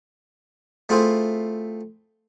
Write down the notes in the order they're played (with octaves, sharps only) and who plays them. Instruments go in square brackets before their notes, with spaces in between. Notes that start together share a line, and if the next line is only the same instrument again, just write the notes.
[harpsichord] A3 C4 E4 F4 G#4 C5